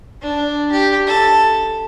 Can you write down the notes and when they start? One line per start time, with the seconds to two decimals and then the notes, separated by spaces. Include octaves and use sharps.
0.21 D4
0.72 G4
1.07 A4